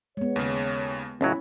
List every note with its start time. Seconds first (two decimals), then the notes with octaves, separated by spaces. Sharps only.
0.17 G#3 B3 C#5
0.36 D#2 C#3
1.21 C#2 A2 F#3 C#4 E4